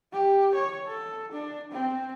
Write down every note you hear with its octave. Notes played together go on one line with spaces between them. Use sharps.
G4
C#5
A4
D4
C4